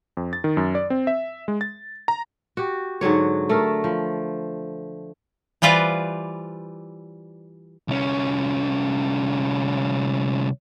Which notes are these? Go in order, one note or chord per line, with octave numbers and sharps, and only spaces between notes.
F2
A6
D#3
F#2
D5
C4
E5
G#3
A6
A#5
F#4 G4
G#2 D3 F#3 C#5
A3 A4 A#4
F3
E3 G3 F4 B4 C5 D5
C2 C#4